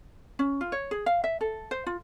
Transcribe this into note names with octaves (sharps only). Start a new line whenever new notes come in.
C#4
F4
C#5
G#4
F5
E5
A4
C5
F4